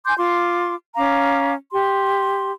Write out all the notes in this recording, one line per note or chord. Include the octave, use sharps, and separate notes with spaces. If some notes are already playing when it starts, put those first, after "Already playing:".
G#5 C6 D6 G6
F4 C6 D6
C#4 F5 A#5 D6
G4 C6